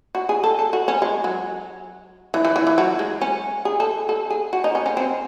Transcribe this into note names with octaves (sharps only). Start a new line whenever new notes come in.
F#4
G#4
A4
A4
F#4
C#4
G#3
F#3
E3
E3
E3
E3
F#3
G#3
C#4
G#4
A4
A4
G#4
F#4
D#4
C#4
C#4
C4